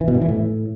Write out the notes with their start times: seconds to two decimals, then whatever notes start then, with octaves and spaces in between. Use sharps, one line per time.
0.01 E3
0.08 B2
0.15 G2
0.22 E3
0.28 A2